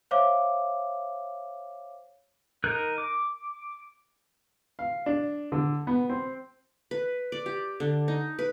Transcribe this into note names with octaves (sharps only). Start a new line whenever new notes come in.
C5 C#5 E5 F5 D6
D#4 A#4 F#6
D6
F5
D4
D3
B3
C4
B4
D5
G4
D3
D#4
B4